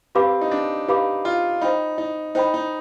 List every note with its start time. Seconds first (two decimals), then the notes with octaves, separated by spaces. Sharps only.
0.15 C4 G4 B4 F5 B5 D6
0.41 D#4
0.51 D4
0.88 D#4 G4 B4 F5 B5 D6
1.25 F4
1.62 D#4 C5 G5 B5
1.98 D#4
2.35 D#4 C5 G5 B5
2.54 D#4